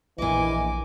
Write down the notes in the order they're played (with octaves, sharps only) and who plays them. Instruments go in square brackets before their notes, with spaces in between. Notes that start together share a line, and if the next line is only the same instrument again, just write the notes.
[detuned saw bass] A#1 [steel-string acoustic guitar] A#2 D#5 [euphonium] E3 [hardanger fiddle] G#5 D6